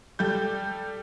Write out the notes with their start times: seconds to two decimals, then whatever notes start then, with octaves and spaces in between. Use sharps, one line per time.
0.19 G3 A4 G6